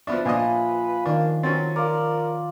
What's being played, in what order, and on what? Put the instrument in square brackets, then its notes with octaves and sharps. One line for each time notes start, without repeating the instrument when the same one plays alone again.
[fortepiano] F3 B3 D4 [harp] E5
[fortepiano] A#2 D4 D#5 [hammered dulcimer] F3 [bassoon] B4 [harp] G#5
[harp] D#3 [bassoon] A#3 [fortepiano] D4
[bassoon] F#3 [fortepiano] C4 C#4 [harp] A6
[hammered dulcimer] F4 D5 [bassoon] A#4